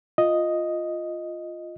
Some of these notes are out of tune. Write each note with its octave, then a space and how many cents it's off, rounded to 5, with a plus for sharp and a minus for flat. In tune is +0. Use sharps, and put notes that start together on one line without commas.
F4 +0 D#5 +0